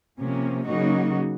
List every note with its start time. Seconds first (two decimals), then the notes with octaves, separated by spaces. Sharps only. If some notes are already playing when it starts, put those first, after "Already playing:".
0.19 C3 F3 A#3 C#4
0.66 C#3 F#3 A#3 D#4 F#4